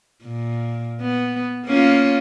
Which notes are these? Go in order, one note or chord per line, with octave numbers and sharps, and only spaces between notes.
A#2
B3
A#3 C#4 F4